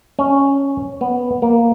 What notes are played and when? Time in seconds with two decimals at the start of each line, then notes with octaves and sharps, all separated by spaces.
0.19 C#4
1.01 B3
1.42 A#3